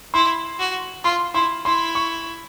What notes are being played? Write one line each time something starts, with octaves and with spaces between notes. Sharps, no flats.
E4 C6
F#4
F4 C6
E4 C6
E4 C6
C#6